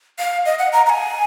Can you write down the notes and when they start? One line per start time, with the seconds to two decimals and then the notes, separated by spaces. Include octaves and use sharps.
0.19 F5
0.46 D#5
0.59 F#5
0.73 A#5
0.86 A#5
0.89 G#5